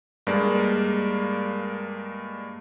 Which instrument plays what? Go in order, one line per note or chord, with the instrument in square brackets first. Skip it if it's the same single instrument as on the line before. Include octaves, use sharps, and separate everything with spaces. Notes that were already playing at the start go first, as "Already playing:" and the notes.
[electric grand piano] G2 G#3 A#3 D5